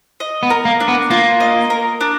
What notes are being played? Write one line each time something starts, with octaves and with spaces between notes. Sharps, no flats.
D#5
B3
A#4
A#3
D4
B3
A#3 F4
D#5
A#4
D4